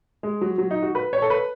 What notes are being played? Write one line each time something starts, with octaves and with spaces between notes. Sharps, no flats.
G#3
F#3
F#3
D#4
F#4
B4
C#5
A4
B4